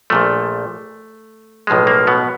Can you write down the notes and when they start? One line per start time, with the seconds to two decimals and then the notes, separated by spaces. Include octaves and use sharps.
0.10 A#1 A#2 F3 A3
1.67 B1 A2 F3 G#3
1.87 A#3
2.07 B2 B3